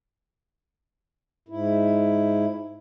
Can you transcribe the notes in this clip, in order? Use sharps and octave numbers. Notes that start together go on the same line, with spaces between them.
G#2 E4